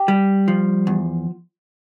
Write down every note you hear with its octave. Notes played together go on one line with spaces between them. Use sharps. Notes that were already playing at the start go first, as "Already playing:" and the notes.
Already playing: G4
G3
F3
E2